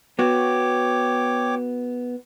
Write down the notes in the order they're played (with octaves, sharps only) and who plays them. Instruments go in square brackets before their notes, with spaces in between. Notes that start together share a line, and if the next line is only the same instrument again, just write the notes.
[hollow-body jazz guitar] B3 F#4 [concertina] C#5 G5 D6